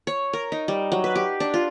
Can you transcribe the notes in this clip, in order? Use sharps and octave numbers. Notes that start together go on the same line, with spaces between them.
C#5
A#4
D#4
G3
F#3
B4
G4
D4
F4